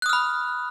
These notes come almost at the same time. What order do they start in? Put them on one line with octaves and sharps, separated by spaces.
F#6 D#6 F6 B5